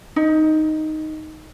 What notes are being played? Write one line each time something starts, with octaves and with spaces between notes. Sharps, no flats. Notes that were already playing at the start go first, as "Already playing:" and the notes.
D#4